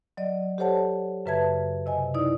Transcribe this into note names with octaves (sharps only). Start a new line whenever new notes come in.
F#3 D5 D#5
G4 A4 C5 C#5 F#5 A5
F#2 C#3 B4 E5 A5 G#6
C3 D#5 G#5
D#4 E4 D5 D#6